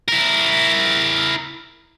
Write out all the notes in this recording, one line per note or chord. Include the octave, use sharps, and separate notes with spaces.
E4 A#4